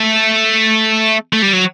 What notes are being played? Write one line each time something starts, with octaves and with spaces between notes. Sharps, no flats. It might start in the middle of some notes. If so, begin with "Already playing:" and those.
Already playing: A3
A3
G3
F#3